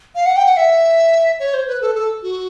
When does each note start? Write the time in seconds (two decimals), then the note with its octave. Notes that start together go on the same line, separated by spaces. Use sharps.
0.15 F5
0.26 F#5
0.36 G5
0.46 F#5
0.57 E5
1.40 C#5
1.54 C5
1.67 B4
1.82 A4
1.95 A4
2.23 F#4